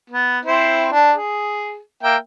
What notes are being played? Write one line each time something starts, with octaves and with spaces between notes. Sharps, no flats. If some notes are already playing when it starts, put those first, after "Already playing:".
B3
C4 E4 C5
D4
G#4
A#3 E5 G5